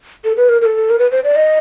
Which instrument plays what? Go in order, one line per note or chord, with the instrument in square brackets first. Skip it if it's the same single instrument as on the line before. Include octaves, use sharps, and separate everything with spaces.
[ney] A4
B4
A#4
A#4
A4
A#4
B4
C5
D5
D#5